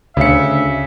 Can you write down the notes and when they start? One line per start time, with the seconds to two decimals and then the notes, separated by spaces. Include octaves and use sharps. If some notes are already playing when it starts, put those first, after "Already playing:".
0.17 D2 C#3 E5 C#7